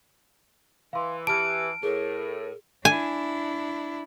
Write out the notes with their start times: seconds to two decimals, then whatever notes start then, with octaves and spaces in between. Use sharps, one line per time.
0.93 E3 F5 C6
1.27 E3 G4 A5 F6 D7
1.83 A2 G#4 A#4
2.85 D4 E4 G#5